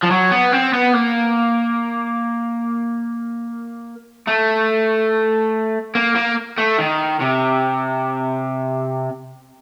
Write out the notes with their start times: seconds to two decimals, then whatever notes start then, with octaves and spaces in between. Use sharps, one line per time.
0.03 F3
0.10 F#3
0.31 B3
0.53 C4
0.73 B3
0.94 A#3
4.28 A3
5.95 A#3
6.15 A#3
6.58 A3
6.78 D#3
7.20 C3